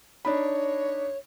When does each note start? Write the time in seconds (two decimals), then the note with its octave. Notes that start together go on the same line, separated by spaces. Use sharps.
0.25 D4 D#4 C#5 B5